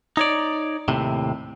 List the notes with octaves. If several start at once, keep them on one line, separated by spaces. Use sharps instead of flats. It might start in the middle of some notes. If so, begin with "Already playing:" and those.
D#4 C#5 D5
D#2 A2 C3